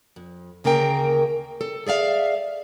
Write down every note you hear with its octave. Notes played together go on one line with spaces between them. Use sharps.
F2
D2 C#3 A#3 A#4 G5
A4
G#4 D5 E5 F5